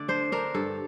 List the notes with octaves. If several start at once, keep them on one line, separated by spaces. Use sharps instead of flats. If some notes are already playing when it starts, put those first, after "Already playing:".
Already playing: D3 A3 D5
D4 C5
D4 A#4
G2 A4